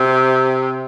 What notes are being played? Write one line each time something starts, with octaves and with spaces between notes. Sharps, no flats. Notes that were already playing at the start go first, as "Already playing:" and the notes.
Already playing: C3